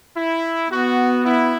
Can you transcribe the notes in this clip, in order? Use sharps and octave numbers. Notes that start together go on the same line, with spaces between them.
E4
B3 F#4
E4